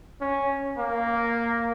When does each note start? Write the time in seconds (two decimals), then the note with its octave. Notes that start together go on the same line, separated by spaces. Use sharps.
0.21 C#4
0.78 A#3